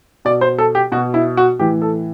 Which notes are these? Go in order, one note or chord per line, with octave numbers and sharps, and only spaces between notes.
B2 D5
C5
A4
G4
B2 F#4
E4
F#4
A2 E3 G4
A4